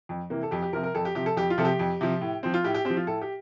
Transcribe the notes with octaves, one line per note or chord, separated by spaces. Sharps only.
F2
C3 E3 A#3
A4
F2 G4
G4
C3 F3 A#4
A#4
F2 A4
G4
C3 F3 G4
A4
F2 G4
F4
C3 F3 A4
G4
F2
C3 F3
A2
F3 C4
F4
A2 G4
G4
F3 C4 G4
F4
A2 A4
G4